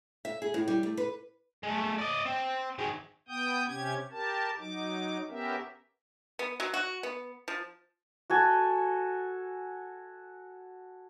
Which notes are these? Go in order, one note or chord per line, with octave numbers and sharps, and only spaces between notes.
E5
G#4
A2
G3
A3
B4
G#3 A3
D5 D#5
C4
D#3 G#3
B3 G5 D#6 G6
C3 C#4 G4 G#6
G4 A#4 A5
F#3 D#4 D6
B3 C#4 G4 A#4 E5
B3
F#3
F#4
B3
F3
F#4 A4 G#5